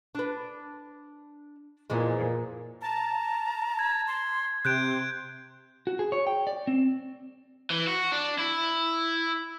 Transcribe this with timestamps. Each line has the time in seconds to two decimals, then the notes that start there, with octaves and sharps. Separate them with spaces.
0.15 D4 B4
1.90 A#2 E3 F3 G#3
2.82 A5 A#5
3.79 G#6
4.07 C6
4.65 C3 C6 F#6 G6 D7
5.87 F#4
5.99 G#4
6.12 C#5
6.27 G5
6.47 D5
6.67 C4
7.70 E3
7.87 F#4
8.12 D4
8.38 E4